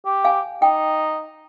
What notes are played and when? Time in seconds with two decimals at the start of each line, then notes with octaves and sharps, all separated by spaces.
0.05 G4
0.24 F5 G#5
0.62 D#4 G5